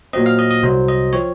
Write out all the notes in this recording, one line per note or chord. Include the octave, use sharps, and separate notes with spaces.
A#2 F#3 C4 D#5
F5
D#5
D#5
C2 C3 F#3 C5
D#5
F3 C4 C#5